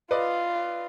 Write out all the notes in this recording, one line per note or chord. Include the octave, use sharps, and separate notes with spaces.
F4 B4 D5 D#5